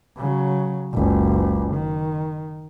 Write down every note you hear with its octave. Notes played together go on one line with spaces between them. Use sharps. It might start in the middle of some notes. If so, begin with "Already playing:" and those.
C#3 F#3
F#1 C#2
D#3